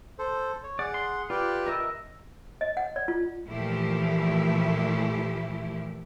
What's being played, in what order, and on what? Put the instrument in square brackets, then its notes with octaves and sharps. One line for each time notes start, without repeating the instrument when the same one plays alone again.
[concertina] A4 C5
C#5
[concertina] G#4 F#5 [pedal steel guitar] D5
[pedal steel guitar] C6
[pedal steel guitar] F4 [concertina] G4 B4 D5
[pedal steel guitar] A#4 D#5 E5
[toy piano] D#5
F#5
D5
F4
[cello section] A#2 E3 F3 A3 E4 G4